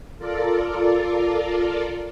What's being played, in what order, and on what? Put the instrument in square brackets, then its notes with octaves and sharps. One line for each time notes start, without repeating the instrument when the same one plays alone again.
[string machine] F4 A4 A#4 D5